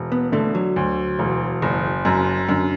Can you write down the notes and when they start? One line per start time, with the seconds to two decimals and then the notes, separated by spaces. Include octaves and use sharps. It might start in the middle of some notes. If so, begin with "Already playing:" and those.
Already playing: E1
0.12 B3
0.32 D3 A3
0.55 F#3
0.76 D2
1.19 E1
1.62 F#1
2.05 F#2
2.49 F#2 D3